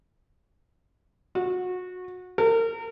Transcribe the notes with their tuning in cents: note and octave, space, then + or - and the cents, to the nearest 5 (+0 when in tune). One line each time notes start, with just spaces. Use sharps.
F#4 -25
A#4 -35